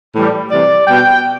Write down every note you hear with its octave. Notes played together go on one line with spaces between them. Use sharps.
A2 E3 G3
C3 E3 G3 D5
B2 G3 G5